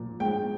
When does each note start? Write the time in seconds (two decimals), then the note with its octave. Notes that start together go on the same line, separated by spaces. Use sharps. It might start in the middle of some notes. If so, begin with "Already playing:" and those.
Already playing: A#2 F3
0.20 G#3 G5